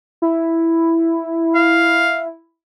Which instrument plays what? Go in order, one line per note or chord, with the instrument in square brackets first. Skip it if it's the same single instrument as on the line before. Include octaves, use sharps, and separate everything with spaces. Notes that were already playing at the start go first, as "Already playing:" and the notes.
[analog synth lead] E4
[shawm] F5